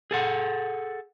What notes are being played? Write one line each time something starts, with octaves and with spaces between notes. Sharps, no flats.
G#4 A4 F#5